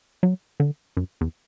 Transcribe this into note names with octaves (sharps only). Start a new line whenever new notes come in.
F#3
D3
F#2
E2